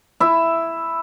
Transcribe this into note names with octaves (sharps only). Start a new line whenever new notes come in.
E4 E5